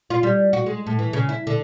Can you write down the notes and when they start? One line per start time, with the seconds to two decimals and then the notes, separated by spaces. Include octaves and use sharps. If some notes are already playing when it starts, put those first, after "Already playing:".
0.10 F4
0.23 G3
0.53 F#4
0.66 G#3
0.86 A2
0.99 E3
1.13 C#3
1.29 E4
1.47 D3